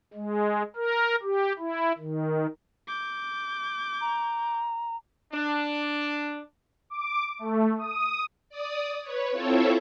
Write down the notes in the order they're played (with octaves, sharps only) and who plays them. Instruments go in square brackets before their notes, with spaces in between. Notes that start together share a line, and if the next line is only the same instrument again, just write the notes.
[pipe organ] G#3
A#4
G4
E4
D#3
[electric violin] D6 G6
[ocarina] A#5
[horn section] D4
[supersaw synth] D6
A3
D#6
[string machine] D5 D#6
B4 C#5
C4 E4 F4 A4 C#5 E5